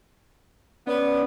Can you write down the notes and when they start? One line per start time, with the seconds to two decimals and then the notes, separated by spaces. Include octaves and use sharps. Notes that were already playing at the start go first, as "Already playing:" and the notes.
0.87 B3 C#4 D5